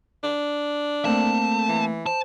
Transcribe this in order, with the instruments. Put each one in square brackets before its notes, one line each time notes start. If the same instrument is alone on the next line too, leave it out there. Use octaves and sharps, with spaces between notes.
[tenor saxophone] D4
[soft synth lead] A3 [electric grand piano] A#3 C4 [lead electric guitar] A5
[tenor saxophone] E3
[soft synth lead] C5 [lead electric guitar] A5